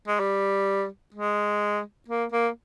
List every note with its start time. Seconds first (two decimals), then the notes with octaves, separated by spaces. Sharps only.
0.08 G#3
0.20 G3
1.14 G#3
2.08 A#3
2.32 A#3